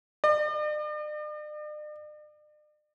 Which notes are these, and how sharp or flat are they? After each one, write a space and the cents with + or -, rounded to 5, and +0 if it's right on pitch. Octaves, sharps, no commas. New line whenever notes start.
D5 +45